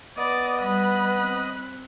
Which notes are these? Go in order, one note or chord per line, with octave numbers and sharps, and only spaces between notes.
B3 D5 D#5
G3 B5 F#6
C4